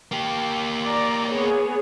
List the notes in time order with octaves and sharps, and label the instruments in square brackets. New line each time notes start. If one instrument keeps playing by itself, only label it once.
[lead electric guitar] A#3 G4
[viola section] D5 A#5
B3 G#4 C#5